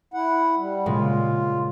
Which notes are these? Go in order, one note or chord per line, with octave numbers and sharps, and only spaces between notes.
E4 F#5
G3
A#2 C#3 G#3 F4